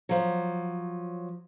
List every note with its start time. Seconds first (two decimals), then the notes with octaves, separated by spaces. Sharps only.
0.09 F3 F#3